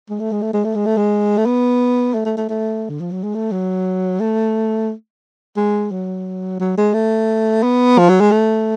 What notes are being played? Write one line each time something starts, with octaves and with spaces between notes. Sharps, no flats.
G#3
A3
G#3
A3
G#3
A3
G#3
A3
G#3
A3
B3
A3
A3
A3
A3
D3
F3
F#3
G#3
A3
F#3
A3
G#3
F#3
F#3
G#3
A3
B3
F3
F#3
G#3
A3